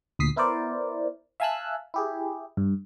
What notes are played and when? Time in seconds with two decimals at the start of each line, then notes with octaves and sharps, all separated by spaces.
0.19 D2 A#2 D#6 B6 C7
0.36 B3 E4 A#4 C5 D5
1.40 E5 F5 G#5 A5 E6 F#6
1.94 E4 G4 G#4
2.57 G2